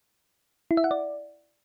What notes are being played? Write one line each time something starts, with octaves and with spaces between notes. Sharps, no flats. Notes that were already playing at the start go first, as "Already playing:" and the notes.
E4
E5
F#5
D5